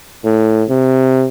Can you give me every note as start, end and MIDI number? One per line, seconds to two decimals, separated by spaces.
0.25 0.63 45
0.69 1.28 48